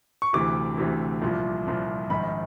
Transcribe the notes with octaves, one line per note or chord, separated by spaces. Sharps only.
C#6
D2 C3 E3 D6
D2 C3 E3
C2 A#2 F3
C2 A#2 F3
A#1 G#2 D#3 B5